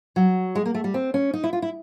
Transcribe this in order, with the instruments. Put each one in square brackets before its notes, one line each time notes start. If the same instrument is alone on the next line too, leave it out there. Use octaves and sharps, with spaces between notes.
[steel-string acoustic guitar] F#3
G#3
A#3
A3
G3
C4
C#4
D#4
E4
F4
E4